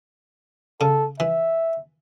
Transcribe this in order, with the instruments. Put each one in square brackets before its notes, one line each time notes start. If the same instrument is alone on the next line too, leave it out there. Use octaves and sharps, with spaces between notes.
[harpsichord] C#3 [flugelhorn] A4
[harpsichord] E3 [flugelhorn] E5